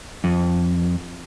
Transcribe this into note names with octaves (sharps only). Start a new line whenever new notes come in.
F2